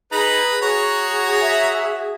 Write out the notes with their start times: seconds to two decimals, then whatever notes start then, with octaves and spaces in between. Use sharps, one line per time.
0.12 D#4 G#4 B4 A#5 B5
0.61 F#4 G#4 C#5 A#5
1.41 E5